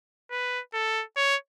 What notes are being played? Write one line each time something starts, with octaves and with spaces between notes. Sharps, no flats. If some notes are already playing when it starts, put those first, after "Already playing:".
B4
A4
C#5